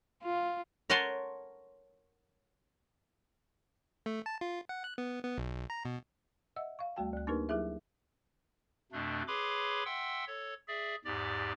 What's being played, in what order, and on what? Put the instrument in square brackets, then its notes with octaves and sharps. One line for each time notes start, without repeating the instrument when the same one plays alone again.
[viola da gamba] F4
[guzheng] A#4 C#5 F#5 G#5 A5 C6
[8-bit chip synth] A3
A5
F4
F#5
F#6
B3
B3
B1
A#5
B2
[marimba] D#5 E5 F#5 E6
F5 C#6
D2 G3 A3 F#4 G5 A5
D2 F#6
A#3 D4 D#4 G4 A#4 B4
F#3 E4 G4 G#4 E5
[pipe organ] F2 B2 A3 D4
G#4 B4 C#5 B5 C6 D6
E5 F#5 G5 C6 E6
A4 C#5
G#4 D5 E5
E2 G#2 G4 D5